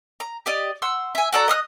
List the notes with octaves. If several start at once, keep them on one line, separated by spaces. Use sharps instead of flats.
A#5
G4 D5 D#5
F#5 C6 E6
E5 G#5
F#4 A4 D5 A#5
D#5 D#6 F6 F#6